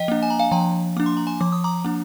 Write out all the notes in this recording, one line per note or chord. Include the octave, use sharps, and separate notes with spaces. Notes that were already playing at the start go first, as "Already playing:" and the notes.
Already playing: F3 D#5 F5 G5
A#3 D4
G#5
A#5
F5 G#5
F3 G5 A#5
A#3 D4 D6
C6
A#5
G#5 C6
F3 D6
D#6
A#5 D6
A#3 D4